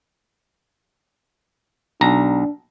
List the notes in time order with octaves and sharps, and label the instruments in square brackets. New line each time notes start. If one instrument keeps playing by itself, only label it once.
[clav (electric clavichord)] B1 A#5 [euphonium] D4